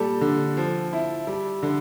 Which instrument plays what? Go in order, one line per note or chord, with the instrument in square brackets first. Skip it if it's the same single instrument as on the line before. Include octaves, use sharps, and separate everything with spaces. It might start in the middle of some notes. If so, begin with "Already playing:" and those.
Already playing: [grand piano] A#2 G3 A4
D3
F3
E4
G3
D3